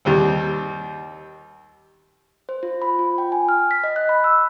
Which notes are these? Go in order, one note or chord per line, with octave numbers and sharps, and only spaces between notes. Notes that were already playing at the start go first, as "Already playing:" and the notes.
D#2 G3 C4
C5
F4
B5
F4
G5
G#5
F6
B6
D#5
F#6
B5
E6